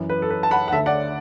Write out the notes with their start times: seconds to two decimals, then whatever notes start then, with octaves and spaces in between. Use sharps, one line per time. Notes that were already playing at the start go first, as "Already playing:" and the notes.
Already playing: F#2 E3
0.09 B4
0.22 A4
0.30 B4
0.43 A5
0.51 F#5 B5
0.68 F#5
0.72 D2 D3 E5 A5
0.86 D5 F#5